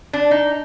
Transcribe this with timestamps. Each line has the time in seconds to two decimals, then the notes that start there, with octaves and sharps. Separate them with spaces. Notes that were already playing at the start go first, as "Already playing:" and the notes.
0.13 D4
0.31 D#4